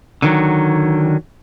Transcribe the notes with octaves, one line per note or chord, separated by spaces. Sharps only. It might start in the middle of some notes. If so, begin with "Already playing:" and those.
D3 D#3 F#3